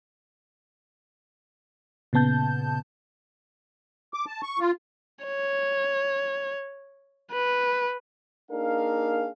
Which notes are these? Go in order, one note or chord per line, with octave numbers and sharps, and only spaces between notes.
A#2 C#3 B3 A5 G6
D6
A5
C#6
F4
C#5
B4
A#3 D4 D#4 G#4 A#4 F5